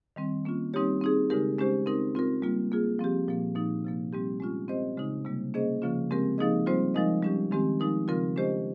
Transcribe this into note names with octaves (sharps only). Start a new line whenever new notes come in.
D#3 G3 C4
A#3 C#4 F4
G3 C4 D#4 G4 C#5
C4 D#4 G#4
C#3 G#3 D#4 G4 A#4
G#3 C#4 G4 C5
C4 D#4 A#4
C4 F4 A#4
G3 A#3 F4
A#3 F4 G#4
F3 C4 G4
A#2 F3 A#3
A#2 F3 A#3 D#4
C3 F3 A#3
G3 C4 G4
G#3 C#4 F4
C4 G4 C5 D#5
C#3 G#3 D#4
C3 G3 A#3
A#3 C#4 G#4 C5 D#5
C#3 F3 A#3 C#4 F4
C#3 G#3 C4 G4 A#4
F3 A#3 D#4 G#4 D#5
G3 C4 F4 C5
F3 G#3 D#4 A#4 D#5
G3 C#4 G4
D#3 G#3 C4 G4
F3 G#3 D#4 A#4
C#3 F3 C4 F4 A#4
G#3 C#4 G4 C5 D#5